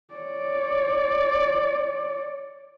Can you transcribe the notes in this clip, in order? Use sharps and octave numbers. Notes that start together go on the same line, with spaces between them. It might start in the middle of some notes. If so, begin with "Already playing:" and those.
C#5 D5